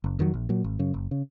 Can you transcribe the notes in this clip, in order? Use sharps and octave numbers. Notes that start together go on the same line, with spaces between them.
F#1
F2 D#3 F#3
A#1
A#2 F#3
G#1
F#2 C#3
F#1
C#3